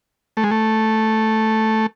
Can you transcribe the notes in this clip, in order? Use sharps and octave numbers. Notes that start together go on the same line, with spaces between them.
A3
G#3
A3